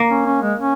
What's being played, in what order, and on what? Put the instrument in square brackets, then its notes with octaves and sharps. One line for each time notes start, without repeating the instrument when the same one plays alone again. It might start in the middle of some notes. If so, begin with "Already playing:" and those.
Already playing: [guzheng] A#3
[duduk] C#4
C#4
G#3
C#4